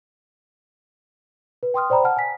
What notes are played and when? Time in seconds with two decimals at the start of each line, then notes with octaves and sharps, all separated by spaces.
1.63 B4
1.74 G5 C6 D#6 F6
1.90 C5 D5 G5 A#5 B5
2.04 F#5 A5 F6
2.17 G#5 B6